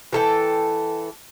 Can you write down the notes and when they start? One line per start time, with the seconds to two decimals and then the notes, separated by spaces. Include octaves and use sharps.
0.13 E3 A4 G5